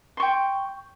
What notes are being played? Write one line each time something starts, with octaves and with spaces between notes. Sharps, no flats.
G5 C6 C#6